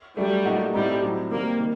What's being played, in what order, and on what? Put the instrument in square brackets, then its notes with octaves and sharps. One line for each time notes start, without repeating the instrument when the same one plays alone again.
[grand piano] F#3 A3 D4 [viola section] G3
[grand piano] A#2 A3 D#4 F#4
[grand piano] A2 A3 C4 D#4 [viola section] G3
[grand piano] A2 F#3 C4
[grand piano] D#3 G3 C4 G4 [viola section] A#3
[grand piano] D#3